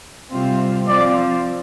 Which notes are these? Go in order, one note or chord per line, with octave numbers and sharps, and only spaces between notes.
C3 G3 C4 F4
F3 C4 F4 D5